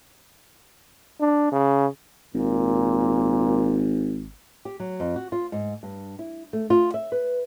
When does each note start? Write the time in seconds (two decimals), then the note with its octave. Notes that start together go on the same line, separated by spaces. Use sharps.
1.20 D4
1.52 C#3
2.34 G#1 A#2
4.65 G4
4.80 F#3
5.00 F2
5.16 F#4
5.32 F4
5.52 G#2
5.83 G2
6.19 E4
6.53 A3
6.70 F4
6.94 E5
7.12 B4